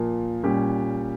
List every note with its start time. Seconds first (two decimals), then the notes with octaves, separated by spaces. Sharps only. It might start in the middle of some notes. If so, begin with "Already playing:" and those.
Already playing: A#2 F3 A#3
0.43 A#2 G3 C#4 G4